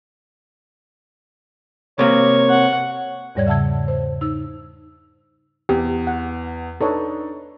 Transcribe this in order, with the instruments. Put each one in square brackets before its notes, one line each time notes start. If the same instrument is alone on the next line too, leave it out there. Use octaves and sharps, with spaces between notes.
[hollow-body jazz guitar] C3 A#3 [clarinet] C#5
[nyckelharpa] F#5
[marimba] E2 G#2 G3 C#5 D5 G#6
C#3 E5 F#5 A5 E6 G#6
C5
D#4 E6
[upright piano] E2 [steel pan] G4
[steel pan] F#5
[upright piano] D4 D#4 [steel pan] A4 B4 C#5